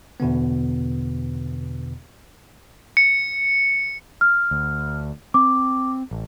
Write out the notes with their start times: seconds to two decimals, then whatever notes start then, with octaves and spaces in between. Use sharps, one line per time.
0.20 E2 B2 D3 B3
2.97 C#7
4.21 F6
4.51 D2
5.34 C4 D6
6.11 A1